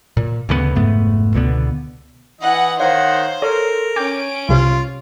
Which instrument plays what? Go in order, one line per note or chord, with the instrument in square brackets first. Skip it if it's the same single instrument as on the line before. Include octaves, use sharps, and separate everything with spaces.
[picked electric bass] A#2
D2 C#3 G#3 B3
F1 G#2 A3 B3
C#2 B2 D3 B3
[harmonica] E3 D#5 [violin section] F#5
[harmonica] D#3 F#5 [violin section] C5 [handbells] C#5 F5
[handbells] A4 [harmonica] A#4 [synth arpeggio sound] C#5
[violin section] C#4 D7 [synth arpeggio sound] G5 [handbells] D6
[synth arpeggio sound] C2 C3 [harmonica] F4